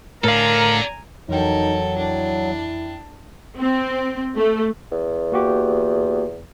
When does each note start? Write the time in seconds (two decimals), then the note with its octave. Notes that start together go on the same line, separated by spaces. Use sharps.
0.24 A2 A4 A#4 D5 F5 G#5 A#5
1.29 F2 E3 F#3 D#4 A4 A#4 G5
1.97 D4 E4
3.59 C4
4.36 A3
4.92 E2
5.32 A#3 F#4 G4